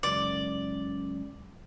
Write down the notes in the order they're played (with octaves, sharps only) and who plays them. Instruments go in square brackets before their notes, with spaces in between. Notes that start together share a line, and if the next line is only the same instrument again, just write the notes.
[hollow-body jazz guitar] C#2 F#2 [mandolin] D5